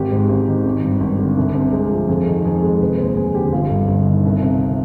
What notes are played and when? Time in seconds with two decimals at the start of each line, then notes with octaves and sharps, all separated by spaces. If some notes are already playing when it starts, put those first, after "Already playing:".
Already playing: G#1 G4
0.12 G#2
0.29 G#1
0.47 D#3
0.65 G#1
0.83 G2
1.00 G#1
1.19 D3
1.37 C2
1.55 C3
1.73 G#3
1.91 F3
2.09 F2 G#4
2.27 D#3
2.45 F2 G#4
2.63 G#3
2.81 F1 B4
2.98 D#2 C5
3.17 F1 G#4
3.35 D3 G4
3.46 G4
3.53 G1 F4
3.70 G2
3.88 G1
4.07 D#3
4.25 C2
4.42 C3